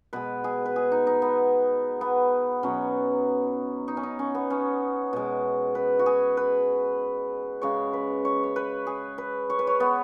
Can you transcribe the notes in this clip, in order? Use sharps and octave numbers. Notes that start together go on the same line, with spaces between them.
B2 G#3 B4
G#4
B4
G#4
D#4
D#4
B3
B3
B2 F#3 C#4
D#4
C#4
D#4
C#4
B3
C#4
B2 G#3
B4
F#4
G#4
B4
C#3 G#3 C#5
B4
C#5
C#5
B4
G#4
B4
C#5
B4
C#5
B3